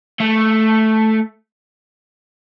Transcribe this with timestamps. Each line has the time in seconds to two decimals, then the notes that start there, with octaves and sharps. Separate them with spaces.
0.20 A3